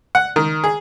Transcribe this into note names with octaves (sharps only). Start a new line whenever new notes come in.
F#5
D#3
G#4